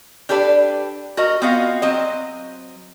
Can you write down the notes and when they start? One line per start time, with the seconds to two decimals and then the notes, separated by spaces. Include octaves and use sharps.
0.29 D4 G4 A4 B4 D5
1.17 F#4 A#4 D#5
1.42 B3 C4 F4 F#4 D#5 F5
1.82 F#3 C4 D#5